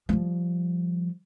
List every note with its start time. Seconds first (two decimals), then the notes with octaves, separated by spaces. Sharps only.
0.09 F3 G3